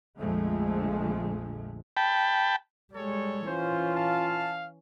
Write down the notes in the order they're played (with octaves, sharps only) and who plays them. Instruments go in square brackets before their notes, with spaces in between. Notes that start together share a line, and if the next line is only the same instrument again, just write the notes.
[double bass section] A#1 F2 D3 F3 G#3 A3
[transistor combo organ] G5 A5 B5
[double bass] G3 G#3 [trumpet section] A4 C#5
[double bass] E3 C#4 [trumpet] F4 [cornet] C5
[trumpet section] F5 [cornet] A5